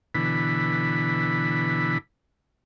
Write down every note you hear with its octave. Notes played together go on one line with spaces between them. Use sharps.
B2 D3 E3 B5